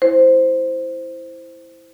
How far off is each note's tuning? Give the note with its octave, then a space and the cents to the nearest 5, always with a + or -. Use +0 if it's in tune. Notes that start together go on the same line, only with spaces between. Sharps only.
E4 +0 C5 +0